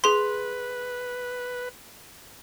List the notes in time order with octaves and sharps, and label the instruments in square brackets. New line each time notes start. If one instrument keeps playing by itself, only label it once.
[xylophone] G#4 C6 [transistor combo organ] B4